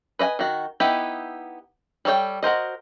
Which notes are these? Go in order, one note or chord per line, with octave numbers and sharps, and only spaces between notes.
B4 D#5 F#5 G#5
D#3 F#4
B3 D#4 E4 G4
G3 A4 C#5 D5 G5
F#4 A#4 C5 D#5